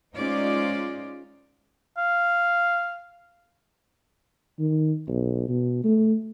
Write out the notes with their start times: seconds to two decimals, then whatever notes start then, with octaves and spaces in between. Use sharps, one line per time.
0.15 G#3 C#4 D#4 F4 C5 D5
1.97 F5
4.59 D#3
5.08 B1
5.49 B2
5.84 A3